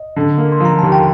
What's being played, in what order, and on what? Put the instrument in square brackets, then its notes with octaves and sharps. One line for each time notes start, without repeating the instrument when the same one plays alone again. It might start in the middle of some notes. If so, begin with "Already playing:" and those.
Already playing: [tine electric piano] D#5
[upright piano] D3
A#3
[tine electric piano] C6
[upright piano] F3
[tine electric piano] A#5
[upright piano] D#2 [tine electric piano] A5
[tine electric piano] G5